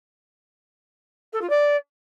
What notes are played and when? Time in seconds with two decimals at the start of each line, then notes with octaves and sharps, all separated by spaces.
1.33 A4
1.41 F4
1.50 D5